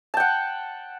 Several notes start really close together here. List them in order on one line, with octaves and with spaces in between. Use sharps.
A5 G5 F#5